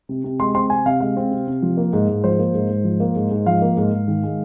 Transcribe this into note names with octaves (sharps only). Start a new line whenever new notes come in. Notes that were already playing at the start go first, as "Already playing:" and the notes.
C3
C3
G#3 C6
C4 C6
C3 G#5
C3 F5
G#3 F5
C4
C3
C3
F3
A#3
G#2
G#2
F3 C5
A#3
G#2
G#2
F3
A#3
G#2
G#2
F3 F5
A#3
G#2
G#2
D#3
G#3